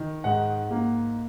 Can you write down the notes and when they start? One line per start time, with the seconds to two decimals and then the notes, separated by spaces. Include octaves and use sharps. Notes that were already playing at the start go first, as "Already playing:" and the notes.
Already playing: D#3
0.24 G#2 F#5
0.71 A#3